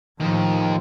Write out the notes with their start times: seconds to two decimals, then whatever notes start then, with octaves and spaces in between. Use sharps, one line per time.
0.20 D#2 A2 F3